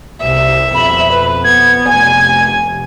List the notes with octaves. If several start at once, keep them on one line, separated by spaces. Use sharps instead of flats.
C2 E5
F2 B2 B5
B4
B3 G#6
F1 G#5